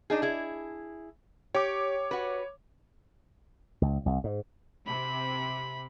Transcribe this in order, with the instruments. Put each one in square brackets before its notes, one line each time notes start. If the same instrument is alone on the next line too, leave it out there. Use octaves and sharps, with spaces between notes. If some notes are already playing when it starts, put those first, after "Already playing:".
[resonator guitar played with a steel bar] D4 D#4 G#4
E4 G#4
[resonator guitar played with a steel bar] G4 [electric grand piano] C#5 D6
[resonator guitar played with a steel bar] F#4 B4
[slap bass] C#2
C2
G#2
[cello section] C3 [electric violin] B5